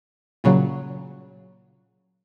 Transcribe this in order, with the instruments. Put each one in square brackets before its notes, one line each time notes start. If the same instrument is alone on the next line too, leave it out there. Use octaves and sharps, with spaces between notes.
[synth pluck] A#2 C#3 F#3